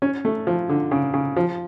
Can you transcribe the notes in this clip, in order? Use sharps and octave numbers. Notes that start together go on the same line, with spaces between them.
C#4
A3
F3
D3
C#3
C#3
F3